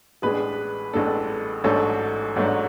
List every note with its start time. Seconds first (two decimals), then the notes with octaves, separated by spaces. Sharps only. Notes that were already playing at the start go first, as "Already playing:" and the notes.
0.22 A1 A2 G#3 D4 G#4 B4
0.93 A1 A2 G#3 D4 A4
1.64 A1 G#2 F#3 A3 D4 A4 C#5
2.36 A1 G#2 F#3 A3 D4